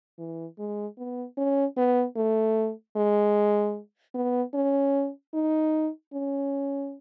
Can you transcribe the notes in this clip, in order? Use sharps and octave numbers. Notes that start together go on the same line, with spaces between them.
E3
G#3
B3
C#4
B3
A3
G#3
B3
C#4
D#4
C#4